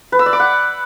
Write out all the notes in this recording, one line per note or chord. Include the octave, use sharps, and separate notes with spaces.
B4
E6
D5
D6
F#5